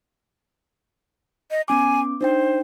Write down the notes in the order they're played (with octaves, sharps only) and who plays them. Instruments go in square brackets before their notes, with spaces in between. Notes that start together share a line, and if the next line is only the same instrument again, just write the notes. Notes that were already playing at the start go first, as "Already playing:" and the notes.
[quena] D#5
[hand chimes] B3 C#4 D6 [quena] G#5
[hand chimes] D4 D#4 G5 [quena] C5